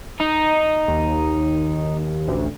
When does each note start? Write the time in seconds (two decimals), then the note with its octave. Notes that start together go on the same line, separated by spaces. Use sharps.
0.20 D#4
0.88 D#2
2.27 A1 D2